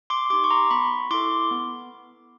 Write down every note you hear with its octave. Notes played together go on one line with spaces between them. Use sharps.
C6 D6
D#4 G4 C6 D6
C#6
A#5 C6
B3 B5 C#6
E4 A4 C6 D6
B3